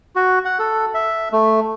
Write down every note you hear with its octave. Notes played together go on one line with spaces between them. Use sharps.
F#4
F#5
A4
E5
A3